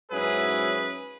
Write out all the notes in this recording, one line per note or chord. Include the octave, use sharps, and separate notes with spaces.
G#2 F#3 C#4 E4 G#4 B4